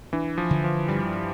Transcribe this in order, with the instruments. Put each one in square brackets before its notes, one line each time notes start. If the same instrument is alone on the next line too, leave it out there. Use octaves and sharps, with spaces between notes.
[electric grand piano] E3 [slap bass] D4
[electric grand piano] F3
[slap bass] D3
[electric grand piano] F3
[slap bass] G2 [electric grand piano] G3